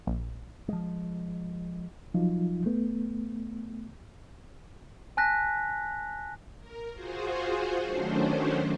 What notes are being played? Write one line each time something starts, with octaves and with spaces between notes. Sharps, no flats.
A#1
F3 G#3
F3 F#3 D#4 F4
A3 B3
G#5 A5 F#6 A#6 B6
A#4
F4 F#4 G#4 C5
D#3 F#3 A3 C#4 D4 C5